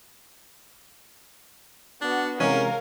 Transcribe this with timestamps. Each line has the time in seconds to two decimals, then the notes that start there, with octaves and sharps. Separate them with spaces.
2.01 B3 D4 F#4
2.40 C3 E3 G#3 C#4 A#4 F5